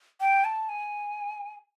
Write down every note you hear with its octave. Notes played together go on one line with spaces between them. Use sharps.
G5
A5
G#5